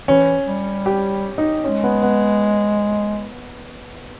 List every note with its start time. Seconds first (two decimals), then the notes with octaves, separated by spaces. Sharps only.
0.08 E3 C#4
0.47 G3
0.86 G4
1.38 D#4
1.64 G#3 C#4
1.83 B3
2.02 B3